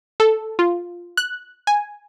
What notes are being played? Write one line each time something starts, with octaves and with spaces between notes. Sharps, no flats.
A4
F4
F#6
G#5